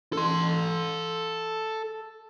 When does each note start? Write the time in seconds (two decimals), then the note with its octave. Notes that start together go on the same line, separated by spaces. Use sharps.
0.13 A4 C6